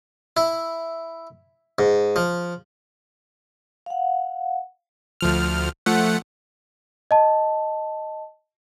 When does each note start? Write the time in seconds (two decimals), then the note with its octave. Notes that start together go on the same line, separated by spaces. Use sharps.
0.37 E4
1.79 G#2
2.16 F3
3.86 F5 F#5
5.21 D2 F3 F6
5.86 F3 A3 F#5
7.11 D#5 A5